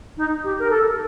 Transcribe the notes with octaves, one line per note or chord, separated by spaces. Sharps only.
D#4
G4
A#4
A4